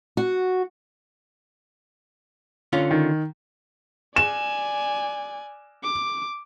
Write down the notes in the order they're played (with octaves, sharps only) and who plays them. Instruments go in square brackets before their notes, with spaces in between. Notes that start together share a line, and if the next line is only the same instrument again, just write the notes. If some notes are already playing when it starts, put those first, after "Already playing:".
[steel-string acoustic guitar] F#4
[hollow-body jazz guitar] D3 C#4 F4
[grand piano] D#3
[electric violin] D5 G#5 [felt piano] E7
[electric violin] D6